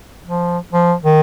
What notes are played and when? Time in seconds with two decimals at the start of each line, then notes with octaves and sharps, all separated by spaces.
0.26 F3
0.73 F3
1.03 D#3